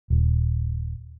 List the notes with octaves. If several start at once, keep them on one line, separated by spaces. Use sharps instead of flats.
D#1